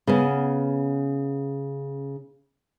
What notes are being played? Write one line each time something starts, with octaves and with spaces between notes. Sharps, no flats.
C#3 B3 C#4